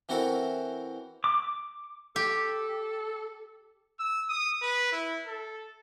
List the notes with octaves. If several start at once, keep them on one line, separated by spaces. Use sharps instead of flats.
E3 C4 E4 F#4 A4 A#4
D6
G4 A4
E6
D#6
B4
E4
A4